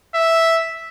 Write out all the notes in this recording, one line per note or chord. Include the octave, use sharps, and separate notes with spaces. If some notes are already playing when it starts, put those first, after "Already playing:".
E5